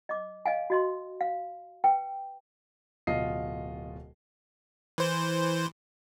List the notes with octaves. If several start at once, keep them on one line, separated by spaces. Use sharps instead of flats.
D#5 D6
D#5 F5 G#5
F#4 D#5 C6
F5
B4 G5
D1 B2 F4 D#5 C7
E3 C5